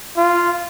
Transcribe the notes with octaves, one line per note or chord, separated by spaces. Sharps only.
F4